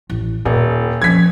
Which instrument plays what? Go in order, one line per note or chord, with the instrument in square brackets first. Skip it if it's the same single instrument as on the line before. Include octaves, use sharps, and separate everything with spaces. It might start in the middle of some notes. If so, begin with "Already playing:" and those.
[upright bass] A1
[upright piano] D#1 [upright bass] A#2
[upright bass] F3 C#4 [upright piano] G#6 B6